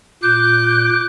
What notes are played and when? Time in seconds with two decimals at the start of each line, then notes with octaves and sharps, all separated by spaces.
0.23 A#2 D6 F#6 G6